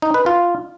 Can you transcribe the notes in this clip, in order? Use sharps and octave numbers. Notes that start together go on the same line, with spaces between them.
D#4
B4
F4